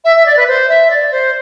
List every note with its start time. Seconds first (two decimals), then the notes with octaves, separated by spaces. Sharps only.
0.05 E5
0.16 E5
0.26 D5
0.37 B4
0.47 C5
0.69 E5
0.90 D5
1.11 C5